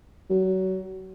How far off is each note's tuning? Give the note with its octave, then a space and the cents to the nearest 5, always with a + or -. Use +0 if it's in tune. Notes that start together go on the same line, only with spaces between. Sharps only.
F#3 +30